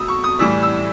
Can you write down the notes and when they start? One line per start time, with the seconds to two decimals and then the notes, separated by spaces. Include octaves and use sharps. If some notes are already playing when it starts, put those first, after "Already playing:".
Already playing: B2 F#3 A3 D#6 E6
0.08 C#6
0.24 D#6
0.39 A2 E3 G3 E6
0.63 E6